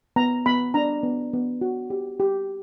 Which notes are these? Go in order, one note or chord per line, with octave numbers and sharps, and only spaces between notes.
B3 A#5
B3 B5
D4 A#5
B3
B3
F#4
G4
G4